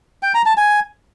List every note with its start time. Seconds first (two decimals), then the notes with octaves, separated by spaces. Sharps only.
0.23 G5
0.34 A#5
0.46 A5
0.57 G#5